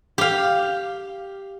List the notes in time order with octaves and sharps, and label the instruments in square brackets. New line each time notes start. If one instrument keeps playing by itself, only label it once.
[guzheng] G4 F5